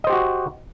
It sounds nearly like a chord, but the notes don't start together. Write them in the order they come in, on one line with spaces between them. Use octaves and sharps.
D#5 C5 G4 F#4